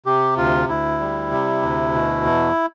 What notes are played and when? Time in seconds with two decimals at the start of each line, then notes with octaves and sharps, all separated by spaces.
0.06 C3 G4
0.37 D2 F4
0.68 D2 E4
0.99 G3
1.32 C3
1.62 D2
1.94 B2
2.25 E2